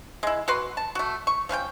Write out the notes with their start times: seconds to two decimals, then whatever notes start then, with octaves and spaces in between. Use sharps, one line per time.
0.23 G#3 E4
0.48 F#4 B4 C6
0.77 A5
0.95 A3 F#4
1.27 C#6
1.49 F3 C#4 B4 G5